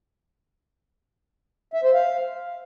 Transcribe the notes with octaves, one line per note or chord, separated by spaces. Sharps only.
E5
C5
F5